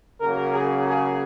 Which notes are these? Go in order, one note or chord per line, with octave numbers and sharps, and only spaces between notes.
C#3 F#3 A#3 A#4
G#4
G#4